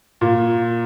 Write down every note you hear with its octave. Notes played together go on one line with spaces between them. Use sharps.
A#2